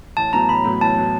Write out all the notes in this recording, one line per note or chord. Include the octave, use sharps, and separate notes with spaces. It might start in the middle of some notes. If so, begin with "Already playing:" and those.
A1 A5
A2 F#3 B3 A#5
A1 B5
A2 F#3 B3
A1 A5
A2 F#3 B3